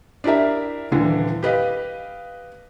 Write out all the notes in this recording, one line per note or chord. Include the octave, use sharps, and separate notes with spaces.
D4 E4 G4 A#4 E5
D#1 D3 E3
G4 B4 D#5 F5